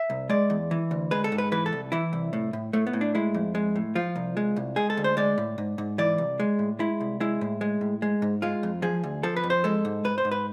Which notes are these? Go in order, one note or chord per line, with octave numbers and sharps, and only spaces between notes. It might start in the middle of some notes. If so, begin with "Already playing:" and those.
Already playing: E5
C2
G#3 D5
E2
E3
D2
G#3 B4
A4
G#2
B4
E3 B4
A4
C2
E3 E4
C2
A2
A2
A2 A3
B3
A2
D4
G#3 E4
F2
G#3
A2
F3 F4
C2
G#3
C2
G#3 G#4
A4
D2
C5
G#3 D5
A2
G#2
G#2
E3 D5
C2
G#3
A2
G#3 E4
C2
G#3 E4
A2
G#3
A2
G#3
G#2
G#3 F4
F2
F3 G#4
D2
F3 A4
B4
F2
C5
G#3 A4
G#2
G#2 B4
C5
G#2
B4